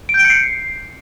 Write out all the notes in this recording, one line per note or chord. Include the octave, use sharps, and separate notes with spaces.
D7
G6
D7
C#7
C7